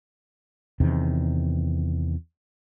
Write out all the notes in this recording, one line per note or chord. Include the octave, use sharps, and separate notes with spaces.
E2 C3 D#3